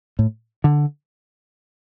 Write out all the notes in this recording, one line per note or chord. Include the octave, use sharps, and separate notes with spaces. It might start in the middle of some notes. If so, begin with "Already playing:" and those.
A2
D3